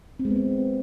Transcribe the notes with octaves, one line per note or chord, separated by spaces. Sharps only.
C4
G#3
B3
C4